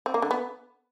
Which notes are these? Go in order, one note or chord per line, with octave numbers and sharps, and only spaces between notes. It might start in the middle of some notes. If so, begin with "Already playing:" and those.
C4
A#3
D3
B3